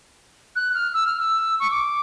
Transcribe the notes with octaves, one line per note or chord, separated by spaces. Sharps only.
F#6
F6
E6
F6
E6
C#6
D6